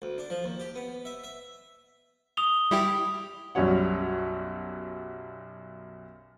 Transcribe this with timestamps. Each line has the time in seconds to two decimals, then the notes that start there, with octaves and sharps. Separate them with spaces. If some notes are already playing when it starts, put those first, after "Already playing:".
0.02 D2
0.18 D4
0.30 F3
0.44 D#2
0.59 G4
0.75 B3
1.05 E5
1.24 E5
2.37 D#6 F7 G7
2.71 G3 E4 G4
3.55 B1 F#2 G3 C#5 F#5